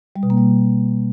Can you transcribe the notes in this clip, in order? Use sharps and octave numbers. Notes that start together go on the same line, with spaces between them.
G3
B2
A#3
G3